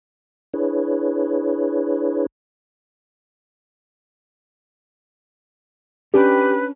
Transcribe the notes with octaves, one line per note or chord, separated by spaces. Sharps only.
D4 E4 G#4 B4 C#5
C#4 D4 G4 B4